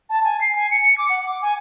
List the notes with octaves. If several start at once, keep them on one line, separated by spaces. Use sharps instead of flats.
A5
G#5
C7
G#5
C#7
D6
F#5
D6
G#5